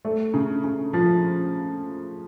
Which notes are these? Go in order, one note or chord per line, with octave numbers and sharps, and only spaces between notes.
A3
C#3
C#3
F3